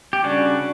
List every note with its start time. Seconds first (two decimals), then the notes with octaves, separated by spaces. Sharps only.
0.13 G4
0.24 C#3 G3 C#4 D4 F#4